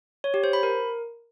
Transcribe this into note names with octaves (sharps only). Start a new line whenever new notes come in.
C#5
G4
C5
B5
A#4